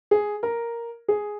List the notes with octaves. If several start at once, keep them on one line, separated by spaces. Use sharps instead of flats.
G#4
A#4
G#4